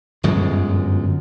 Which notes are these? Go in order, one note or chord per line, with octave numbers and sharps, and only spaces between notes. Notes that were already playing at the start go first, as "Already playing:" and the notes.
G1 F#2 A#2 G#3